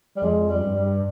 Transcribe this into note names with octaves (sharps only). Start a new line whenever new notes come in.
G3
F2 G#3
G3
G2
G3